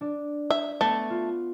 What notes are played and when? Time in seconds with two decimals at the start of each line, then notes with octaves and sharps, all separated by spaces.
0.01 D4 D5
0.50 E5
0.81 A3 B3 D6
1.10 F4